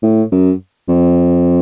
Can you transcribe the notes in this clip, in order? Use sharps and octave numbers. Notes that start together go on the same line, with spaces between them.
A2
F#2
F2